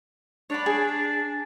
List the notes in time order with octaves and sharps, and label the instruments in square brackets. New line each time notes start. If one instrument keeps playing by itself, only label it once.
[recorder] D4 [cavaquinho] C#5 D5 B5
[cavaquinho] G#4